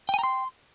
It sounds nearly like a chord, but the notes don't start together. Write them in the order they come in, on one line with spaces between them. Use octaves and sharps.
G5 G#5 A#5 C6